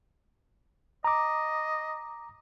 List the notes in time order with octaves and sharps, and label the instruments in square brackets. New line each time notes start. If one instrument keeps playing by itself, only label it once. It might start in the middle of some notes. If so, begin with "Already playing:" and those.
[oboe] D#5 [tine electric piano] A#5 D6